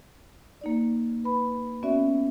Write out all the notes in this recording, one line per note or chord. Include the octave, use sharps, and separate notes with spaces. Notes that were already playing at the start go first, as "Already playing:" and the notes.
A#3 D#4 D5
B4 B5
B3 C#4 F#4 D5 E5